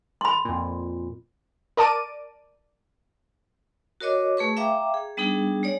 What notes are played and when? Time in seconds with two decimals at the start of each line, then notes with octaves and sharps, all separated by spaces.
0.21 B5 C6
0.45 F2 A#2
1.77 A#4 D5 A5 D6 D7 D#7
4.00 F#4 A#4 C#5 D#5 D6
4.37 A3 G#4 B4 C#6
4.57 E5 F5 G5 A#5 D6
4.94 G#4
5.17 G3 B3 D4 D#4 G#4
5.63 G#3 C#5 D5